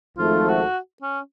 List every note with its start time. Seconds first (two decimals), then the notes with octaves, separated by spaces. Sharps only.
0.17 G#1 G#2 F3 A3 F4
0.49 F#4
1.02 C#4